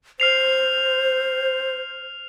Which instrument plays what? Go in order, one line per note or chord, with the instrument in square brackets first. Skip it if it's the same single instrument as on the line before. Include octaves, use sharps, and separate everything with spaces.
[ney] C5 [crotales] F6 C7 F7